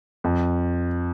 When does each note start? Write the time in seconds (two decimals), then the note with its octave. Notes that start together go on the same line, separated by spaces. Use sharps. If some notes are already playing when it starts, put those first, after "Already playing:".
0.24 F2